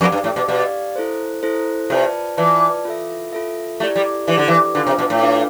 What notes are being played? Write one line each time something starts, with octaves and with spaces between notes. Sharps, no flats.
F2 G4 D5 F5
G2
A2
B2
B2 G4 D5 F5
E4 A4 C5
E4 A4 C5
C3 F4 B4 D5 A5
E3 F4 B4 D5 A5
F4 A4 E5
F4 A4 E5
A3 E4 G4 D5
G3
E3 E4 G4 D5
D3
E3
D3 D4 F4 B4 F5
C3
B2
A2
D4 F4 B4 F5